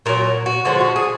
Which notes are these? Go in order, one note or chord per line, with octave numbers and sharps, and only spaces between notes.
A#2 F#3 A#4
F#4
D3 F3 G#3 F#4
F#4
G#4